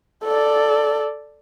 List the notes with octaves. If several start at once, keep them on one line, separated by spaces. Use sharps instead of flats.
A4 D5